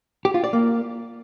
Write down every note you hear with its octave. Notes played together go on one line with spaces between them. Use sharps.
G4
F4
D5
A#3